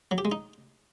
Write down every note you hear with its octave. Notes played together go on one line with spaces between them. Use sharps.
F#3
G4
G#3
D#4